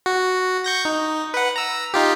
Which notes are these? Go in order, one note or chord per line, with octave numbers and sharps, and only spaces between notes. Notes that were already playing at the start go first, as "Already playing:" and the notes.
F#4
C#6 G6 A#6
D#4
B4 F#5
A#5 E6
D#4 F4 G4